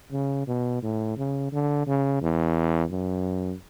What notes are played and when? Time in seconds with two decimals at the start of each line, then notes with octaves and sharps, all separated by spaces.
0.11 C#3
0.47 B2
0.82 A2
1.17 C#3
1.51 D3
1.86 C#3
2.21 E2
2.91 F#2